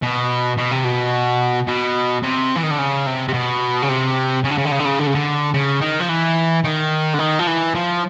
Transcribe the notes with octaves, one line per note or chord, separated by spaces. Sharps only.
B2
B2
C3
B2
B2
C3
E3
D#3
D3
C#3
C3
C3
B2
C#3
C3
C#3
D3
C#3
D3
C#3
D3
C#3
D3
C#3
D3
C#3
D#3
F3
E3
D#3
D3
D#3
F3
E3
F3